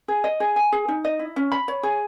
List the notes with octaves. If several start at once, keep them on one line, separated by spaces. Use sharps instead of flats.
G#4
D#5
G#4
G#5
G#4
D#4
D#5
E4
C#4
B5
C#5
G#4